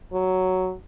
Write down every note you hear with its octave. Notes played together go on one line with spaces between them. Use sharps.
F#3